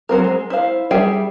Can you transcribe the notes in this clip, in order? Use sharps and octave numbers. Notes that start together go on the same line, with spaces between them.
F#3 C4 A#4
G#3
E4 C5 F5
G3 G#4 E5 G5